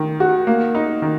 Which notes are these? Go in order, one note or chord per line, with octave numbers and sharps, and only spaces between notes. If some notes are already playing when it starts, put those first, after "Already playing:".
Already playing: D#3
F#4
A#3
D#4
D#3